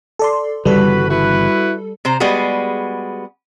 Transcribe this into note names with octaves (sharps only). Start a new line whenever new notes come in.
A4 D5 C6
G1 C#3 E3 G3 F#4 A4 B4
E4 F#4 B4
C3 C5 A#5
G3 G#3 B3 F#4 G#4